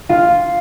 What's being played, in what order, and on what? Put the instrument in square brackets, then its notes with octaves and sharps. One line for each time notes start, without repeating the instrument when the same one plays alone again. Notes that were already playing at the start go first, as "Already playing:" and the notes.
[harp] F4